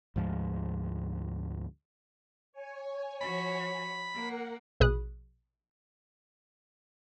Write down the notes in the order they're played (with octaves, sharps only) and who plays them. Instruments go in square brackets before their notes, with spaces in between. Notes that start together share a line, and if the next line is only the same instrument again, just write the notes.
[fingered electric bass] D2 G#2 F3 G#3
[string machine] C#5 G#5
[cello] F3 F#4 [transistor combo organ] B5
[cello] A#3 [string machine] A#4 F#5
[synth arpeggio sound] A#1 B2 G#4 B5 D#6 F#6